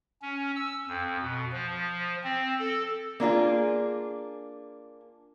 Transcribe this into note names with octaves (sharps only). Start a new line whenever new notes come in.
C#4
E6
F2
B2
F3
C4
A4
A#3 D4 F4 G#4